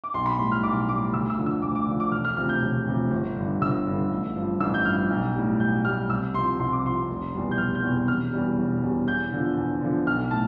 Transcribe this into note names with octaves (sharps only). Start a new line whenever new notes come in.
D6
B1 C6
B5
A2 G3 C6
F6
B1 D6
A2 G3 D6
D2 E6
E6
D3 F3
E6
D2 D6
D6
D3 F3
D6
E1 F6
F6
D2 C3 F3 F6
G6
E1
D2 C3 F3
G1
G2 D3
G1 E6
G2 D3
A1
G2 F3
A1 E6
G6
G2 F3 F6
B1
A2 G3
B1 G6
A2 G3 F6
C2 E6
C3 F3 C6
C2 C6
D6
C3 F3 C6
F1
E2 B2 G3
G6
F1 F6
G6
E2 B2 G3
E1 F6
E2 B2 G3
E1
E2 B2 G3
E2 G6
D3 F3
E2
D3 F3
B1 F6
A2 A5